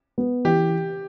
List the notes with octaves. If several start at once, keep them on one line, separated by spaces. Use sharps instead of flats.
B3
E3 G4